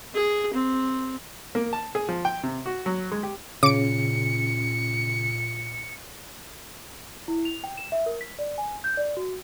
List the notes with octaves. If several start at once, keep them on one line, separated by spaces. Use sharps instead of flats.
G#4
C4
A#3
A5
G#4
F3
G5
C3
F#4
F#3
G#3
G4
A#2 C#3 D6 C#7 D7
E4
F7
G5
E7
E5
A#4
B6
D5
G#5
G6
D5
F#4